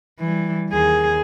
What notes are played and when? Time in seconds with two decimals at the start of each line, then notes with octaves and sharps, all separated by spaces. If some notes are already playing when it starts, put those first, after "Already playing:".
0.19 E3 G3
0.70 D#2 G#4